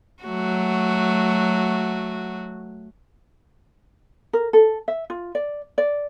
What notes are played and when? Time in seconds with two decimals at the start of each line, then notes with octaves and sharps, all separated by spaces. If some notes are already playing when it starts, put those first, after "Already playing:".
0.23 F#3 A3 F#4
4.33 A#4
4.53 A4
4.88 E5
5.10 F4
5.35 D5
5.78 D5